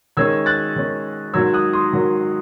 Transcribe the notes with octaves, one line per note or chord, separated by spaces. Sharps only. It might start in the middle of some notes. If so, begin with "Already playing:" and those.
D#3 G#3 C#4 E6 G#6
F#6 A6
D#3 G#3 C#4
G#2 D#3 F#3 E6 G#6
D#6 F#6
C6 D#6
G#2 D#3 F#3